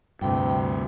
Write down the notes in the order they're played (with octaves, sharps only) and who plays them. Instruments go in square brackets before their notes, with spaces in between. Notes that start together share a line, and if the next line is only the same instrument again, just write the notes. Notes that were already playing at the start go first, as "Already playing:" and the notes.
[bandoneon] D2 [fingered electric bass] G2 C3 [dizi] G5